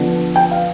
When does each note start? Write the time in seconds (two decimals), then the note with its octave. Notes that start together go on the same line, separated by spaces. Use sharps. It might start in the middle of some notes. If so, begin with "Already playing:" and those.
Already playing: D3 F3 B3
0.36 G5
0.51 F5